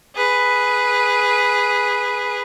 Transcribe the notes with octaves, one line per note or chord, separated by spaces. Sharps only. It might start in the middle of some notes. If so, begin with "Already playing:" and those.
G#4 B4